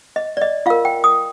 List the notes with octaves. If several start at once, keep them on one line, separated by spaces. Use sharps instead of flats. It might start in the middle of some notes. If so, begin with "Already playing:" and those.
D#5
D5
D#5
F4 A#4 F5
G5
D#6